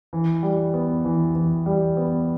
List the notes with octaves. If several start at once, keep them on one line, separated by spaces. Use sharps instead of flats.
E3
G3
B3
E3
E3
G3
B3